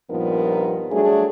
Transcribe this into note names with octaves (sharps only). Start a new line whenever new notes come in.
G2 A#2 F3 B3 D#4 A#4
F#3 G3 A3 D4 G#4